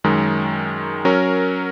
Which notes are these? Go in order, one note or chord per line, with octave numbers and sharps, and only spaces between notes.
F#2 D#3 G#3
F#3 C#4 A#4